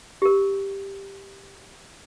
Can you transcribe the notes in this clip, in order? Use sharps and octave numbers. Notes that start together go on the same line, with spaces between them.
G4 A#4